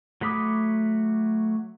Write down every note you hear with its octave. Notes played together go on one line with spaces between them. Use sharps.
F#3 A3 B5 D6 D#6